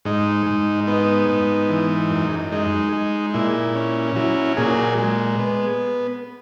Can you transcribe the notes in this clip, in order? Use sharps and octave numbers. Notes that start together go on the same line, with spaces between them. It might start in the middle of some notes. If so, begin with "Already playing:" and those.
G#2 D#4
G#2
B3 D#4
G#2
E3
F#2
G#3 D#4
G#3
A#2 E4
C#4
F#3 E4
A#2 G#4
G#3
B3